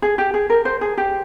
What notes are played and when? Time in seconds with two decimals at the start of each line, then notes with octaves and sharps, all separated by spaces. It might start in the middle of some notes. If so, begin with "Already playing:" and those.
0.02 G#4
0.18 G4
0.34 G#4
0.50 A#4
0.65 C5
0.81 G#4
0.97 G4